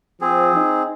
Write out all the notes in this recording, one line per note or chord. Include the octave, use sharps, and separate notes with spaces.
F3 C4 G#4
D#4